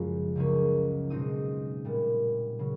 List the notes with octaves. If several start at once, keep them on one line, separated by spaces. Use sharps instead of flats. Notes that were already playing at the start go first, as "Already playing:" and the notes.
Already playing: F#2 C#3 F3 G#3
C#2 C#3 F#3 A#3 C#4
B2 G#3 C4 D#4 D#6
A#2 G3 B3
C#3 F#3